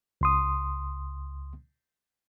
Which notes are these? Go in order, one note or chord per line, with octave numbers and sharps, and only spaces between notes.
C#2 C6 D#6